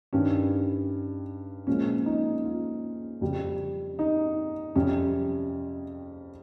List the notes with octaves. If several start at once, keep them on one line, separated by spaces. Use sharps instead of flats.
G2 D#3 G3 C#4
A#2 F3 G#3 C#4
D#4
F4
F2 C#3 G3
D#4
F2 C3 G3 C#4